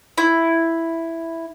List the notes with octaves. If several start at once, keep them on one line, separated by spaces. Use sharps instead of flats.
E4